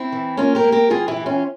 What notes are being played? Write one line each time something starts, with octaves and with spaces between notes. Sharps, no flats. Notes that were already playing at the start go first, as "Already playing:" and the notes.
Already playing: C4 E4
E3
A#3 C#4 F4
G4 A#4
A#3
G4 A#4
E3 F4 G#4
E4 G4
E3
C#4 F4